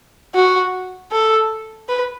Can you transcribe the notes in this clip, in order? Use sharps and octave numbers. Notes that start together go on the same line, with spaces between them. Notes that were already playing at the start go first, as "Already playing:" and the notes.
F#4
A4
B4